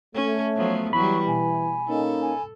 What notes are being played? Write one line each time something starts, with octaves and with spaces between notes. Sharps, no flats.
A3 C#4 C#5
F3 F#3 B3
E3 F#3 G3 B5 C#6
B2 G#5
A#3 C#4 D#4 A4
G#5